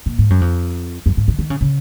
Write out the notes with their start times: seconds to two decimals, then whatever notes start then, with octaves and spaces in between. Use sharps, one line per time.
0.06 A#2
0.19 G#2
0.30 F#2
0.41 F2
1.06 F#2
1.17 G#2
1.28 D#3
1.39 D#3
1.50 C#3
1.61 C#3